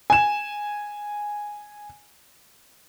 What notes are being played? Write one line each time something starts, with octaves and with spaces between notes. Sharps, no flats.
G#5 E7